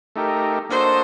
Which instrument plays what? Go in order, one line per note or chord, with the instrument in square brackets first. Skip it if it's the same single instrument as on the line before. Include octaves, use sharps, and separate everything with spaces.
[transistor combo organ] A3 D#4 G4 A#4
[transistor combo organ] A#3 D4 F#4 A4 D#5 [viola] C5